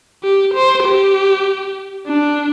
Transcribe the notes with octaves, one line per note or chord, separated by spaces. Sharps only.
G4
C5
G4
D4